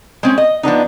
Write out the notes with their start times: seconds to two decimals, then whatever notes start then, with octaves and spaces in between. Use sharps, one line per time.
0.23 G#3 C4 C#4
0.38 D#5
0.63 F3 B3 D4 D#4